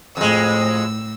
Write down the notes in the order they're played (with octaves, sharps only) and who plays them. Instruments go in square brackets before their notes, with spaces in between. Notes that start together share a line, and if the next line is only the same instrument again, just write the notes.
[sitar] F2 G#3 [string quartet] A2 E6